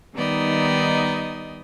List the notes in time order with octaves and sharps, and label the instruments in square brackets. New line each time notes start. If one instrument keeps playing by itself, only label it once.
[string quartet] D#3 G3 B3 D#4 D5 D#5